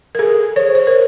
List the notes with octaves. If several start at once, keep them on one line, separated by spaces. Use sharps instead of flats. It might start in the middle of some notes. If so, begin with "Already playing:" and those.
A#4
G#4 A4
C5 C#5
C5
A#4